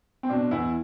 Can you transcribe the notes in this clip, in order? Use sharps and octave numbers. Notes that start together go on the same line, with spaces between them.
C4
B2 D4
E2 E4